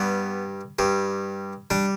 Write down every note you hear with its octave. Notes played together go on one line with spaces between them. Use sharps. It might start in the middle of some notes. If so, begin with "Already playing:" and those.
Already playing: G2 G3 B3
G2 G3
G3 D4